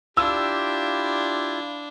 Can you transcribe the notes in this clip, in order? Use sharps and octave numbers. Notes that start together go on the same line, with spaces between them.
D4 E4 F4 G4 E6